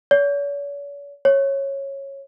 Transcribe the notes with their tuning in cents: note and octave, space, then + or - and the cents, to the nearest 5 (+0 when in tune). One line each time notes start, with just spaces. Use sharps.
C#5 +45
C#5 -15